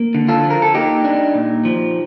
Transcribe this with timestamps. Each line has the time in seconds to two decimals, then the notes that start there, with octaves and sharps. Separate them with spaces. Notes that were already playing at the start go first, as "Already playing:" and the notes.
Already playing: A#3
0.14 D3
0.28 F4 A4
0.44 F3
0.50 A#4
0.62 A4
0.74 A#3 D#4 G4
1.04 D4
1.35 A#2
1.65 F3